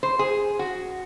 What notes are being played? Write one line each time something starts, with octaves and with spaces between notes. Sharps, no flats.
C5
G#4
F#4